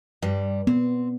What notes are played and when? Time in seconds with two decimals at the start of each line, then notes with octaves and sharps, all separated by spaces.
0.22 G2 G3
0.67 B3 C4